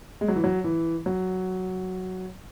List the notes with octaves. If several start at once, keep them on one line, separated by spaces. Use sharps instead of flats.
G#3
F#3
E3
F#3
E3
F#3